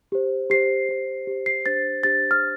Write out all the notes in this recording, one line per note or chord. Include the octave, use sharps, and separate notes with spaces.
G4 C5
G4 C5 C7
G4 C5
G4 C5
C7
D4 G4 C5 A6
D4 G4 C5 A6
F6